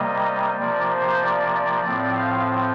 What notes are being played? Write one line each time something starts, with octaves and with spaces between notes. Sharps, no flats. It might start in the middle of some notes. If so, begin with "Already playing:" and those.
Already playing: C3 G3 A#3 D#5
C3 F3 A#3 D5
C5
D5
D5
A2 F3 C4 D5
F5